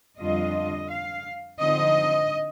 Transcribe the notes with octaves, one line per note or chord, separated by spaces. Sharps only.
F2 D3 G3 D4 F4 D#5
F5
D3 F3 C4 D#4 D#5